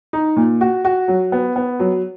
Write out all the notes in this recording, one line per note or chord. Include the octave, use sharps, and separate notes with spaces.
D#4
A#2
F#4
F#4
F#3
B3
B3
F#3